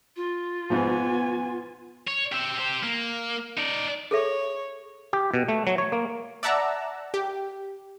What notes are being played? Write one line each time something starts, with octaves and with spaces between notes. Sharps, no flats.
F4
G#2 B2 F3 B3 G#5
C#5
G4 E5
G4 C5
A#3
D#4 D5
G#4 A4 C#5 E5
G4
B2
A3
F#3
C#5
A#3
D5 E5 F#5 A5 A#5 E6
G4